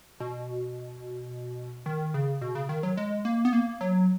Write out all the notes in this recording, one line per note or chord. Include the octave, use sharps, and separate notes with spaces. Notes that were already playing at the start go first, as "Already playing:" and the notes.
B2
D#3
C#3
B2
C#3
D#3
F#3
G#3
A#3
B3
A#3
F#3